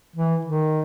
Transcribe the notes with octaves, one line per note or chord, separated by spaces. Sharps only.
E3
D#3